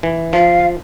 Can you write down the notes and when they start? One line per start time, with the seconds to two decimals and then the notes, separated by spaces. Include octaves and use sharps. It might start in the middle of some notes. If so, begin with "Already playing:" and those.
0.03 E3
0.33 F3 F5